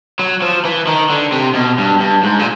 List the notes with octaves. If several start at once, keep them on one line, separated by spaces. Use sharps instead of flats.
F#3
F3
E3
D#3
D3
C3
B2
G2
G2
G#2
A#2